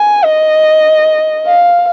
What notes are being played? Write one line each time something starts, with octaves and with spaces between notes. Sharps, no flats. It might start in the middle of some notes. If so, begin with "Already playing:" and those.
Already playing: G#5
D#5
F5